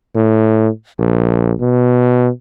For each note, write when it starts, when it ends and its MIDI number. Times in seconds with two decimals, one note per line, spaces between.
0.16 0.68 45
0.99 1.53 34
1.60 2.29 47